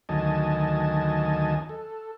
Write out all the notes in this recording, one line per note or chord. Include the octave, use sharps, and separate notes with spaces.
D2 D#3 F#3 D#5 G#5 A5
A4